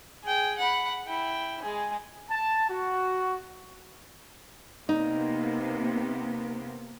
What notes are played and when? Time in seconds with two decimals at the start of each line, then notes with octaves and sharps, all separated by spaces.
0.24 G#4 G5
0.58 F#5 B5
1.07 E4 G5
1.62 G#3 G#4
2.31 A5
2.70 F#4
4.89 C3 A#3 B3 D#4